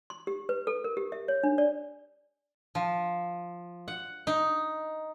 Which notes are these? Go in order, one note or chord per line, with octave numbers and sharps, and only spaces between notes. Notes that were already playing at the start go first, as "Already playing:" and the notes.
C6
G4
B4
A4
A#4
G4
E5
C#5
D4
D5
F3
F#5
D#4